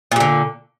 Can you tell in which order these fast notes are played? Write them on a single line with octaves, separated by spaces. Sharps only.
A#2 G3 D3